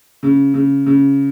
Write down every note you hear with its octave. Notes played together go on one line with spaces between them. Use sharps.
C#3
C#3
C#3